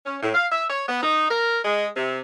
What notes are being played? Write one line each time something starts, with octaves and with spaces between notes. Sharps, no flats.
C#4
A2
F5
E5
C#5
B3
D#4
A#4
G#3
C3